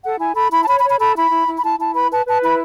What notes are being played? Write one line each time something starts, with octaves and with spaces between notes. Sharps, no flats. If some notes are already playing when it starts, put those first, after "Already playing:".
A4 F#5
E4 G#5
A4 B5
E4 B5
A5
C#5 B5
B5
C#5
B5
A4 B5
E4 B5
E4
E4
B5
E4 A5
E4 A5
B4 B5
B4 A5
B4 A5
E4 B5